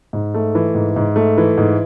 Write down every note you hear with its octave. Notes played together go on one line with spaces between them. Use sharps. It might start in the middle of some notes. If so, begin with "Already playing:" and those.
G#2
A3
E3
G#2
G#2
A3
E3
G#2